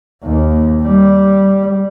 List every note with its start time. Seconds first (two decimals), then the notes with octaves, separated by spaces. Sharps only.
0.23 D#2
0.82 G3